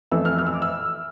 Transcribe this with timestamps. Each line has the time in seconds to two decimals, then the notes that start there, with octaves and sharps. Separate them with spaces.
0.12 F2 E3 A3 E6
0.25 F6
0.38 F6
0.47 E6
0.54 D6
0.62 E6